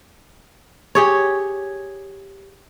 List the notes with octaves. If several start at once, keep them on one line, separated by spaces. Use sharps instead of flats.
G4 G#4 C#5